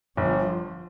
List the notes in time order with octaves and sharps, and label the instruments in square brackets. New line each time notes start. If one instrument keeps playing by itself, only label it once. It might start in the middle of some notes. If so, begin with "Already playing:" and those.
[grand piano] G1 [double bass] F3